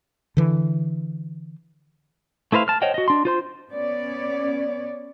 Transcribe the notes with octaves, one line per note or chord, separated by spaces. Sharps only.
D3 E3
A3 E4 B4 C5 F5
A5 F6
C5 C#5 D#5 F#5 G5
F#4 D#5
D4 C6
F4 C5 C6
B3 C#4 C#5 D5